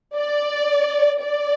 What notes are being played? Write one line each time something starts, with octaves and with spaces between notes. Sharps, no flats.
D5
D5